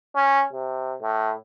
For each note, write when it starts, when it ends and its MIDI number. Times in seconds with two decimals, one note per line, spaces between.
0.15 0.43 61
0.53 0.95 48
1.02 1.33 45